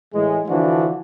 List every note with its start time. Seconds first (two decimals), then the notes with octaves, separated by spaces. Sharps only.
0.14 A2 E3 G#3
0.49 D3 E3 F3 D4 F#4